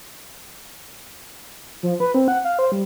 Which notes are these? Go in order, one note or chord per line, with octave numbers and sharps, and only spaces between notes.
F3
B4
C4
F#5
F5
C5
G3